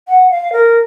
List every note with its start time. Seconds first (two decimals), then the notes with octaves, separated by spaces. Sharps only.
0.08 F#5
0.31 F5
0.53 A#4